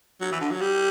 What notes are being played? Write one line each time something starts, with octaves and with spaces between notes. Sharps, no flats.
F#3
E3
D3
F#3
G3